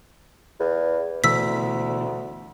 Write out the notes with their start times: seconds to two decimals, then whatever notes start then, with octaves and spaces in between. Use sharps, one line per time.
0.60 E2
1.24 D2 B2 E3 A3 E6 B6